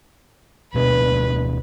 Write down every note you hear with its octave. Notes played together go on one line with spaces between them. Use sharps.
D1 B2 D4 B4